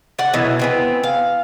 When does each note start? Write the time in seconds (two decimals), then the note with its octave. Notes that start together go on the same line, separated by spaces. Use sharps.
0.19 D5 F#5
0.34 B2 E3 F#3
0.59 E3 B3 C4
1.03 F5